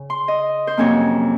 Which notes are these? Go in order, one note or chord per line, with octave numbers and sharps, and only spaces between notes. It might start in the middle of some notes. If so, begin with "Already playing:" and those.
Already playing: C#3
C6
D#5
C5
F2 C3 F#3 A#3 C#4 C#5